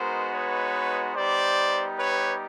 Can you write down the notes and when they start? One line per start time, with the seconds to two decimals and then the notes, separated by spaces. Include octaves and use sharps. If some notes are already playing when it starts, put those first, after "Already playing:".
Already playing: G#3 B3 D#4 F#4 A#4 C5
0.33 B4 C#5
1.14 G3 B3 D#4 G4 C5 D5
1.98 B4 C#5